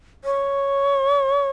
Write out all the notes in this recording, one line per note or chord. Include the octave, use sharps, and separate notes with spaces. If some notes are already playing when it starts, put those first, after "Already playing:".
C#5